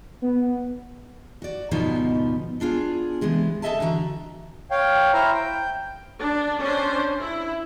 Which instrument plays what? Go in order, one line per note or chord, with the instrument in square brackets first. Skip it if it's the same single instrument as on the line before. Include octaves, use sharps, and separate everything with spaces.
[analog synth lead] B3
[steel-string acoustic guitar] F#4 D5
D2 G#2 B2 F3 B3 D#4
B3 D4 F4 G#4
C3 E3 G#3 B3
A4 B4 D#5 E5 G#5 A5
D3 E3 F#4 A#5
[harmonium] C#5 F5 G5
E4 C5 E5 F5 A#5
G5
[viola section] D4
C#4 D4 C5
E4